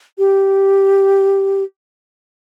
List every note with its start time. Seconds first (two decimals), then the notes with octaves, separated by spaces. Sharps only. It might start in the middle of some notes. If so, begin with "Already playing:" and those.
0.18 G4